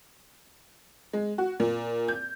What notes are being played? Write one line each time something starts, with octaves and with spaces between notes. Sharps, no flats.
G#3
F#4
A#2
G6